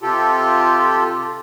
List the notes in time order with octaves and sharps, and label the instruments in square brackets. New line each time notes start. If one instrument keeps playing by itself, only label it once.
[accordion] C3 F4 G4 A4